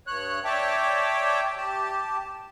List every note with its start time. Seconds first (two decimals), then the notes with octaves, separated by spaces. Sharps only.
0.07 G2 C#5 F#6
0.45 C#5 D5 E5 G5 A5 D6
1.57 G4 A5